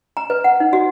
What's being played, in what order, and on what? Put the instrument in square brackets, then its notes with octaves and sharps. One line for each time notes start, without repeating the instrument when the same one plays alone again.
[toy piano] A#5
B4
F#5
D#4
F#4